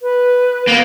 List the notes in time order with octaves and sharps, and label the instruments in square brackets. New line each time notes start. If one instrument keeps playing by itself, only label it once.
[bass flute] B4
[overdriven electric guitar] A#3 B3